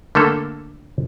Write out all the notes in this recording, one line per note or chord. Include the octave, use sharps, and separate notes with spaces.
D3 A3 A#3 A4